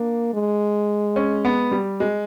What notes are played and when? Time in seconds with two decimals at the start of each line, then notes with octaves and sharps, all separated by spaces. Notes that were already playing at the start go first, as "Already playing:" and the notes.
Already playing: A#3 D4
0.34 G#3
1.16 C#4
1.45 B3
1.72 G3
2.00 G#3